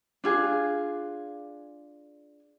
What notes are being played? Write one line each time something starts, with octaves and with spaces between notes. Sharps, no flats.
D4 F4 G#4